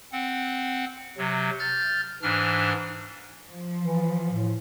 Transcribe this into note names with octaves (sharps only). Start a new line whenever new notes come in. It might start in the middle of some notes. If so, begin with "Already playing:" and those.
C4 F#5
C3 F#3
F6 G6 A6
G#2 E3 D4 F6
F3
E3
A2